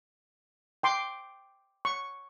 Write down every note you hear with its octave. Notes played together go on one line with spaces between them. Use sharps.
G5 C6 D6
C#6